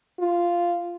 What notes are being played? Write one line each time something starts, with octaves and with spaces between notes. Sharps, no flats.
F4